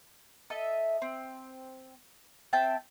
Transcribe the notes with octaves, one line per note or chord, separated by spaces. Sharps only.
A4 D#5 E5
C4
C4 E5 G5 A5